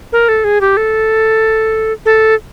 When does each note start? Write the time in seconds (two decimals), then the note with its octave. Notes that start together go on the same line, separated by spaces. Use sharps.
0.12 A#4
0.29 A4
0.44 G#4
0.61 G4
0.77 A4
2.06 A4